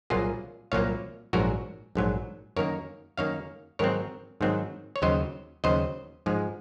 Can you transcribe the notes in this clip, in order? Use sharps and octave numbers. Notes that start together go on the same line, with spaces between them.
C2 A#2 F#3 A#3 F4 G#4
C2 A#2 F#3 A#3 C#5 F5
A#1 G#2 F#3 F#4 A#4
A#1 G#2 F#3
F#2 D#3 A#3 A#4 C#5
F#2 D#3 A#3 C#5 F5
G#2 D#3 F#3 C4 A#4 C#5
G#2 D#3 F#3 C4
C#5
D#2 C#3 F#3 C5 D#5
D#2 C#3 F#3 C5 D#5
G#2 F3 G#3